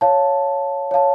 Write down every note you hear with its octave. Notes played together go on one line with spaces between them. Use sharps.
C#5 F5 A5
C#5 F5 A5